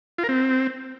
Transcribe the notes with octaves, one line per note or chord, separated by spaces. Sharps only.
F4
A#4
C4